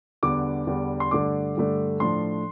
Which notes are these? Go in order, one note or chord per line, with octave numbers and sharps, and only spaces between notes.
E2 D3 G3 B3 D4 D6
E2 D3 G3 B3 D4
C6
G2 D3 A3 D4 D6
G2 D3 A3 D4
A2 F3 A3 D4 C6